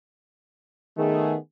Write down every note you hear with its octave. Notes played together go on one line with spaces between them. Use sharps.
D#3 A3 B3 G#4